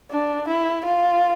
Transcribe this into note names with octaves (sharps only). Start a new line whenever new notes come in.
D4
E4
F4